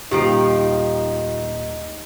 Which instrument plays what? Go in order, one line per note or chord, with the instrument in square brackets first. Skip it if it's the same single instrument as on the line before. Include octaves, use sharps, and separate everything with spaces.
[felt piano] D#1 D7 [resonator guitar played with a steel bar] D#3 F3 [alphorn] D#4 [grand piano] G4